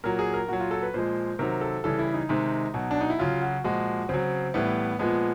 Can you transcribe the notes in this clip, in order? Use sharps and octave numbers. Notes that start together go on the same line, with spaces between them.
A#2 F#3 A#4
G#4
A#4
A#2 F#3 F#4
F4
A4
B4
A#2 F3 G#3 C5
C3 D#3 F#3 A#4
A4
C#3 E3 G3 A4
E4
D#4
C3 D#3 G#3
B2 F#3
D4
D#4
E4
C#3 F#3 F4
F#4
A#2 F3 G#3 F#4
C#3 F#3 C4
A2 E3 G3 B3
A#2 F3 G#3 B3